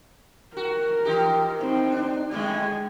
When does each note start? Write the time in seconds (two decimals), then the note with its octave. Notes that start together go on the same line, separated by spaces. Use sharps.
0.57 F#4 A#4
1.05 E3 D#4 G4
1.61 A2 C4 D#4
1.92 D4
2.31 A2 D3 G#3 A3 G#5